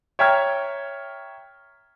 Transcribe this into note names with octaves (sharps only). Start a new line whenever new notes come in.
C#5 E5 G5 A#5 F6 G#6